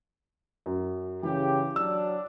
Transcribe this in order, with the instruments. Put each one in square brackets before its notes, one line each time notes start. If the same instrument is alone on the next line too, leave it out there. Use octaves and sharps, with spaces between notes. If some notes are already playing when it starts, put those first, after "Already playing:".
[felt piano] F#2
[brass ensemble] C#3 G4 [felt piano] E3
[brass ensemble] F#3 D4 [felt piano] E6